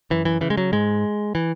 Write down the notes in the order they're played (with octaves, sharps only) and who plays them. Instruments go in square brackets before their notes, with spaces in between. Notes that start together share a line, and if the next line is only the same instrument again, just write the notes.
[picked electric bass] F#2 E3
E3
C#3 E3
G#3
F#3
G#2 G#3
E3